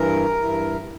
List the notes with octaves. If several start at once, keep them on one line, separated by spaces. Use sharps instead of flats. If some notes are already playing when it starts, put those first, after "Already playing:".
Already playing: G2 E3 A#4
G2 E3